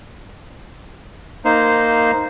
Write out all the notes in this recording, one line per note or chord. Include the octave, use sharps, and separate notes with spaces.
A#3 D#4 C5